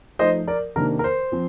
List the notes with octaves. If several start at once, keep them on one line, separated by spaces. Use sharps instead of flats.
F3 A3 D#4 C5 D#5
A#4 D5
C3 D#3 A#3 D4 A#4
A#4
C5
F3 C4